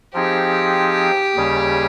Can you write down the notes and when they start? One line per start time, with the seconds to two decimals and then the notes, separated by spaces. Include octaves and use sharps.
0.14 F3 C4 D#4 G4 G#4
1.36 D#2 C#3 G3 C#4 G#4